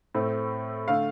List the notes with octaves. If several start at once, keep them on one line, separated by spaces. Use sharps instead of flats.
A2 A3 C4
D3 A3 F5